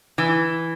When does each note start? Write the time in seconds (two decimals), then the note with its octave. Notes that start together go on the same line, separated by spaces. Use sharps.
0.18 E3